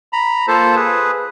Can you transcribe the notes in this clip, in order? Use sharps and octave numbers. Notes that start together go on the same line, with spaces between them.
A#5 B5
A#3 F4 A4 C5 A5
G#4 B4